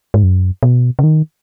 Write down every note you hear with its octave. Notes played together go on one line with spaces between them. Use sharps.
G#2
F#2
B2
C#3
D#3